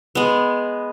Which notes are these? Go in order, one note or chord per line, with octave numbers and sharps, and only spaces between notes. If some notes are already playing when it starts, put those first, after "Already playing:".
G#3 B3